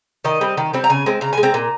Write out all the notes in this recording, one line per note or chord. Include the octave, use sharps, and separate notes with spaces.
D#3 D#5
G3 C4
D#3
G3 C4
A#5
C#3 G#5
G#3 C4
C#3 A#5
G#5
G#3
C4 A#5
A#2